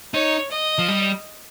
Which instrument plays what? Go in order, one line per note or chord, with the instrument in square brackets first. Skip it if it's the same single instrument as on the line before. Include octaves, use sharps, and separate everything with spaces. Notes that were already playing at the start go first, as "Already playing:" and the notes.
[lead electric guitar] D#4 [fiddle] C#5
[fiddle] D#5
[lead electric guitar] F3
G3